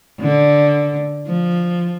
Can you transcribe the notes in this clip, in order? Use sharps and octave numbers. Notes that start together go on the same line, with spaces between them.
D3
F3